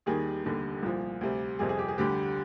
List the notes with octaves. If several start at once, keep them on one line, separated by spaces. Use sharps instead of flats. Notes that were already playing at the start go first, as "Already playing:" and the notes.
D#2 D#3 G3 G#4
F1 D#2 D3 G3
C2 A#2 F3
D2 C3 G3
G1 F2 C3 G#4
G#4
G4
G#4
D2 D3 G3 G4